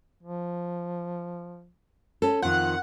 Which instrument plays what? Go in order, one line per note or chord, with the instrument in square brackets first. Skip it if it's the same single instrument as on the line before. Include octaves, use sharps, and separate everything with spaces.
[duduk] F3
[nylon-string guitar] C#4 A4
[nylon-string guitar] F2 D#3 [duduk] F4 [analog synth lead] F#5